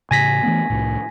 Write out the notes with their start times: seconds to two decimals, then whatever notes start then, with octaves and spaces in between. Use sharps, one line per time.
0.11 A2 C#3 G#5 A#6 B6
0.43 E3 A3 B3
0.70 C2 A2